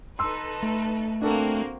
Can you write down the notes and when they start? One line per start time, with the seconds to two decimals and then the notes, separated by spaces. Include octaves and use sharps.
0.19 D#4 A4 B4 C6 E6
0.63 A3
1.22 A#3 C4 D4 F#4 A4 A#4